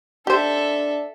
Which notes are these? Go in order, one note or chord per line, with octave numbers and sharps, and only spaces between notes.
D4 G4 A4 C5 E5